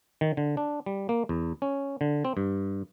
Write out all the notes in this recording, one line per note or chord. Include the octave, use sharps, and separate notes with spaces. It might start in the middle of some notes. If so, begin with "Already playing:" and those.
D#3
D3
D4
G3
A#3
E2
C#4
D3
C4
G2